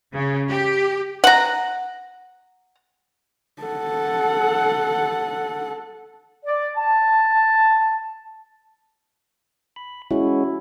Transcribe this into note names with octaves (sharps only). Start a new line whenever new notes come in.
C#3
G4
F#5 A#5
A4 F#5
D5
A5
B5
G#3 C#4 E4 F#4